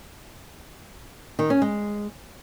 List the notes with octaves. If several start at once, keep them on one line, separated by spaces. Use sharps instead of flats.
D#3
C#4
G#3